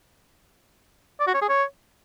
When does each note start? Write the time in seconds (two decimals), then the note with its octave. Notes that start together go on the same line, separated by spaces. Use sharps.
1.20 D5
1.27 F#4
1.34 C#5
1.42 G#4
1.49 C#5